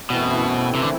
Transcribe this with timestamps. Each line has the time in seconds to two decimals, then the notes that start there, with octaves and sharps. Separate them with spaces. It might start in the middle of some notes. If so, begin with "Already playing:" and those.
0.10 F#2 B2 E3 A3 C4 E4
0.75 C3
0.83 D3